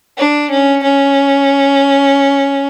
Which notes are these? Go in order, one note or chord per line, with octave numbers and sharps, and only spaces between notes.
D4
C#4
C#4